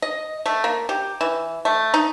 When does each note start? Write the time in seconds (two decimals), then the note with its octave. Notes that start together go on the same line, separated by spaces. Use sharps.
0.02 D#5
0.46 A3
0.64 A#3
0.89 G4
1.21 E3
1.65 A3
1.94 D#4